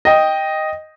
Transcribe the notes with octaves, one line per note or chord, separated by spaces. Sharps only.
D#5 G5